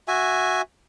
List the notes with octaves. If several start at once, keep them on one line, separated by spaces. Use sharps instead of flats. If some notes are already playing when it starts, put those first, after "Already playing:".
F#4 E5 G#5